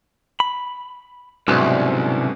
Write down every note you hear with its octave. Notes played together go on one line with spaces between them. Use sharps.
B5
C2 G#2 B2 D3 F#3 C#4 B4